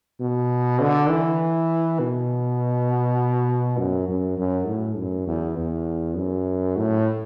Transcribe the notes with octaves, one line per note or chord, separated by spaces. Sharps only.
B2
D3
E3
B2
F#2
F#2
F#2
A2
F#2
E2
E2
F#2
A2